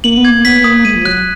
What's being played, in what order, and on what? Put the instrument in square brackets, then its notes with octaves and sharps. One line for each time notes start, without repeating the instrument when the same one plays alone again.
[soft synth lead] A#3 [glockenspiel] F#7
[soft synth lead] B3
[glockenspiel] G#6
[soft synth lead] A#3
[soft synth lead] B3 [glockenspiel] B6
[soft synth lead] A#3 [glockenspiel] D#6
[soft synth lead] G#3 [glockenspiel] D#7
[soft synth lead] F3
[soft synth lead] F#3 [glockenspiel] F#6